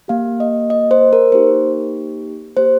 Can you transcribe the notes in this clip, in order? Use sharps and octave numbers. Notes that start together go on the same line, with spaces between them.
A#3 G4 F5
D#5
D#5
C5
A#4
A#3 D#4 G4 C5
A#3 G4 C5